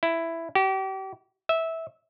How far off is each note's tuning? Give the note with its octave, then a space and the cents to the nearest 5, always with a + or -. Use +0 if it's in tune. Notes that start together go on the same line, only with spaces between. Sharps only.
E4 +5
G4 -35
E5 -15